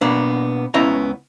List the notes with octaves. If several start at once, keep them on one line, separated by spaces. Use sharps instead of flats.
B2 A#3 B3 D4
C#2 B3 C#4 E4 D#5 A#5